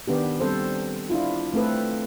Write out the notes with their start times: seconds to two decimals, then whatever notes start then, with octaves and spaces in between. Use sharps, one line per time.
0.08 D#3 B3 D4 G4
0.40 G3 C4 A4 C5
1.10 D4 E4 F4
1.54 A3 C4 A4 B4